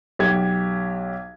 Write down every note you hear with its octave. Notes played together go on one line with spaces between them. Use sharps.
B1 G4 G#6